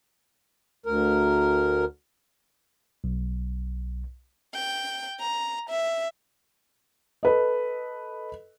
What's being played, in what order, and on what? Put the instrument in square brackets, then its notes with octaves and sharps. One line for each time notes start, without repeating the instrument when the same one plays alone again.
[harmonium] D2 A#4
[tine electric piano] B1
[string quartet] G5
A#5
E5
[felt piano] A4 B4 D#5